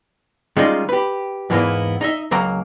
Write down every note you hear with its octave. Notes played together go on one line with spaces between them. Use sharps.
D#3 G3 G#3 C#4 D#4 F4
G4 B4
E2 G#2 E3 A#3 B3 E4
D#4 D#5 E5
C#2 F#3 A#3 A#5